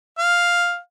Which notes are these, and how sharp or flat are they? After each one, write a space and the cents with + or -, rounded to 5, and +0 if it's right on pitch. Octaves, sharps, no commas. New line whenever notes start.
F5 +5